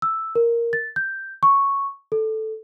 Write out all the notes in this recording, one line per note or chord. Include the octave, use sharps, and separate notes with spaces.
E6
A#4
A6
G6
C#6
A4